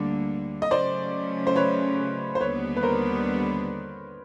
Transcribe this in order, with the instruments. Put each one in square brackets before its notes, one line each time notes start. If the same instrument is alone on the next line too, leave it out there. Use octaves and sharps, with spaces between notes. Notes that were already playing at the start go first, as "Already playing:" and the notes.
Already playing: [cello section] D2 D3 G3 A#3
[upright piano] D#5
[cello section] C#3 F#3 A3 C#4 [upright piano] C5 D5
[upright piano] C5
B4 C#5
C5
[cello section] D#2 D3 G3 B3 D4 [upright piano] B4 C#5
[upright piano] B4
A#4 C5